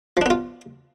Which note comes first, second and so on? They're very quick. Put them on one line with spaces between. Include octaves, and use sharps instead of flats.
F3 D4 B3 F4